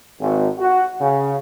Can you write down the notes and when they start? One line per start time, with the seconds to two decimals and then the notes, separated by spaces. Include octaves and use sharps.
0.21 G#1
0.59 F#4
1.01 C#3